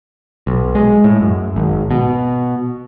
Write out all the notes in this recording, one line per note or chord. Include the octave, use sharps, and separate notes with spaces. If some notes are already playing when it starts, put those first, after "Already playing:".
B1
G#3
A2
F#2
G#1
B2